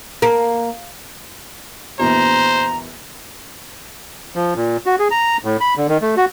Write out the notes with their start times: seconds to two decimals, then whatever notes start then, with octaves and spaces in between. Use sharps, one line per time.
0.22 A#3
1.99 A#1 E2 B2 C5 A#5
4.35 F3
4.56 A#2
4.86 F#4
4.99 G#4
5.11 A#5
5.45 A2
5.60 B5
5.77 D3
5.89 D#3
6.01 A3
6.17 F#4